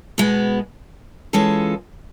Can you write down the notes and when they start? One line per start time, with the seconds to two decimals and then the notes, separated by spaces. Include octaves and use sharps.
0.18 B2 G#3 B3
1.33 E3 G#3 C#4 F4 A4